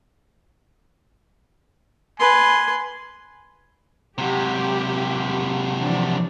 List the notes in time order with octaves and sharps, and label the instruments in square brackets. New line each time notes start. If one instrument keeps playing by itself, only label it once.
[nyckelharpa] B4 C6 [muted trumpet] G#5
[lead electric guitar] C3 F#3 [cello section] G4
[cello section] E3 F3 D4